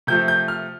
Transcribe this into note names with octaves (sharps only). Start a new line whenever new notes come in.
C3 F3 A3 G6
G6
F6